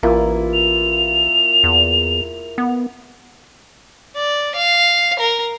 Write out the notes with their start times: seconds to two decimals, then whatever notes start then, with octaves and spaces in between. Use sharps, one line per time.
0.03 A1 A#3 E4 F4
0.53 F7
1.63 E2
2.58 B3
4.16 D5
4.55 F5
5.19 A#4